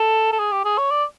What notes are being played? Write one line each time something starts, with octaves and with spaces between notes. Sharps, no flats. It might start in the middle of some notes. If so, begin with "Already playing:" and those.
Already playing: A4
A4
G#4
G4
G#4
C#5
D5